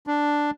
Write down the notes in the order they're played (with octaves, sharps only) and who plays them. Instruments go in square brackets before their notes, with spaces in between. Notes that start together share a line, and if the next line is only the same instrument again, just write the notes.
[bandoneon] D4